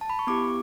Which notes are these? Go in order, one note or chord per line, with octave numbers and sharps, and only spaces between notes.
A5
B5
C#6
B3 E4 G4 D6